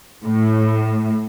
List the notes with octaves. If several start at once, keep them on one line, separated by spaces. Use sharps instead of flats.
A2